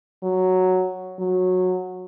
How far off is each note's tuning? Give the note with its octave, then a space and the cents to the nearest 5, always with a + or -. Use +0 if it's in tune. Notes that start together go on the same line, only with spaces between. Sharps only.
F#3 +0
F#3 -15